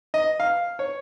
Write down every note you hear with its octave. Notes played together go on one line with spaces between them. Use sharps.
D#5
F5
C#5